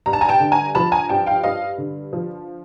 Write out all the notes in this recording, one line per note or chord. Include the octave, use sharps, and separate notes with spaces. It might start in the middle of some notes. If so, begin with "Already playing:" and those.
G2 A#5
A5
G#5 A#5
G5 A5
D3
G#5 A#5
F3 A5 B5
G#5 A#5
G2 G5 A5
F5 G5
G2 D#5 F5
D3
F3